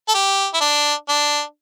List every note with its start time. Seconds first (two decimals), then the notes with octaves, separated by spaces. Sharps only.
0.09 A4
0.15 G4
0.54 E4
0.61 D4
1.09 D4